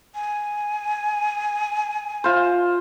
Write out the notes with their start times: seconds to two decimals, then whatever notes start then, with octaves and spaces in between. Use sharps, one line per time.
0.15 G#5
2.24 F4 C5